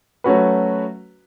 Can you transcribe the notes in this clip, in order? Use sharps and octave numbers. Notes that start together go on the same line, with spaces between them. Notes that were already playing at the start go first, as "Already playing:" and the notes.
F#3 A3 C#4 F#4 B4